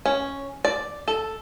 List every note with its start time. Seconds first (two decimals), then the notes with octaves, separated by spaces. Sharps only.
0.06 C#4
0.65 D5
1.08 A4